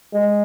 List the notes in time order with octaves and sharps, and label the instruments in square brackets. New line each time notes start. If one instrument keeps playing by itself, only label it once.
[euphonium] G#3